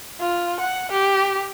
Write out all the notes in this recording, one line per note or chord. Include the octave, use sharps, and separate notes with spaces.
F4
F#5
G4